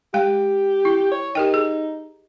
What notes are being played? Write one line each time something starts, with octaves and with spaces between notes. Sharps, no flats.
G#3 G4 G5
E4
C#5
D#4 G4 A#4 G5
G#4